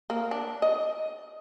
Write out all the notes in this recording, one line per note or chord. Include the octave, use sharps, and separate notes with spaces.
A#3
D4
D#5